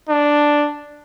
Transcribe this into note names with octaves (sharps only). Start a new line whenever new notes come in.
D4